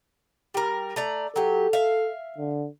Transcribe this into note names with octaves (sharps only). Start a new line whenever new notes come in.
G3 A#4
A3 D5 A#5
F#3 G4 A4
E5 F5
D3